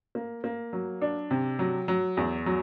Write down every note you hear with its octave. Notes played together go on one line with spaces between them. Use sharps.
A#3
A#3
F#3
D4
C3
F#3
F#3
E2
F#3